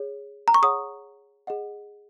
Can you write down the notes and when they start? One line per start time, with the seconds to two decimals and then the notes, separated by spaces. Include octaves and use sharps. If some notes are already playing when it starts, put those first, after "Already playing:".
Already playing: G#4 C#5
0.48 A#5
0.54 C#6
0.62 G#4 C#5 F#5 D#6
1.47 G#4 D#5 F#5